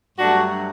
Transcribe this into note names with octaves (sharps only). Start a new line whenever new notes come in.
G2 F#3 A3 D4 F#4